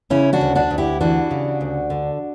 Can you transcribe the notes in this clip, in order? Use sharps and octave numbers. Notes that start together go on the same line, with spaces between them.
C#3 C#4 E4
D4 F#4
D2
D4 F#4
D2
E4 G4
E3 D4 F#4
C#3
D2
D3